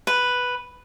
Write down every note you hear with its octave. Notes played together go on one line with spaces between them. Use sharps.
B4